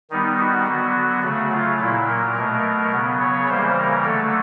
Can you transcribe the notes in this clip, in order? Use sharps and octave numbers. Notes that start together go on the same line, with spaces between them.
D#3 G3 B3 D#4
F#4
D3 F#3 B3
C#3 F#3 A3 F#4
F4
A#2 F#3 A#3 E4
A#4
B2 F#3 A3
C#3 F#3 B3
C#5
C#3 E3 G3 A#3 C5
A#4
D3 F#3 A3 A4